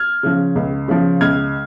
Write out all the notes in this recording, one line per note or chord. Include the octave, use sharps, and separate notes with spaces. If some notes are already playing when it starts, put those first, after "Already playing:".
Already playing: F6 G#6
C#3 F3
C#2
C#3 F3
C#2 F6 G#6